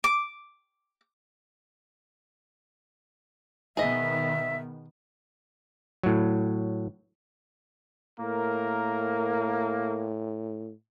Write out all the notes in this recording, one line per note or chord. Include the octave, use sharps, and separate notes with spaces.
D6
B2 D#3 B3 G#4 D#5 E5
A2 F#3
A2 A#3 A#4